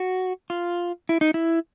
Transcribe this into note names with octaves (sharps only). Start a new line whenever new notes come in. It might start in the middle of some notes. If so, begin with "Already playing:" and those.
Already playing: F#4
F4
E4
D#4
E4